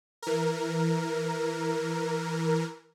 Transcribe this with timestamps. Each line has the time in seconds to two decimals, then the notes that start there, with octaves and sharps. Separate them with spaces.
0.22 E3 A#4